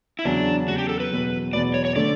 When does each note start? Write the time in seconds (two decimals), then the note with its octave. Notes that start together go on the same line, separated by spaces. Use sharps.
0.19 E4
0.25 E2 C#3 F#3 C#4 D4
0.68 E2 C#3 F#3 C#4 F#4
0.78 G4
0.89 A4
1.00 B4
1.11 E2 B2 F#3 B3
1.53 E2 B2 F#3 B3 D5
1.74 C#5
1.85 C#5
1.96 D3 A3 D5